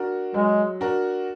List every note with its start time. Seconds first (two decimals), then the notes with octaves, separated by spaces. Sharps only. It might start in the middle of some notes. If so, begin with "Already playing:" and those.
Already playing: D4 F#4 A#4
0.34 F#3 G#3
0.81 D4 F#4 A#4